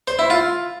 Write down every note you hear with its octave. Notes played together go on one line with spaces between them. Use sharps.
C5
E4
F4